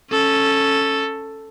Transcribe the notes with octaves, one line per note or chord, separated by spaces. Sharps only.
C#4 A4